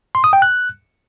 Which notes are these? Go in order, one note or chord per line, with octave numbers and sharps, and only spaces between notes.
C6
D#6
G5
F#6